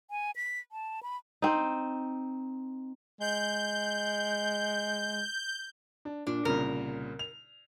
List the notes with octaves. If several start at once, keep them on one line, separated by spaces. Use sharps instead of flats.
G#5
B6
A5
B5
C4 D#4
G#3 G6
D4
A#2 D4
C2 A#2 C#3 A#4
F7